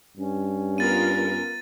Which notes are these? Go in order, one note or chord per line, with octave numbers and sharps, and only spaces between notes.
G2 C#4
B3 F4 A#4 A6 D#7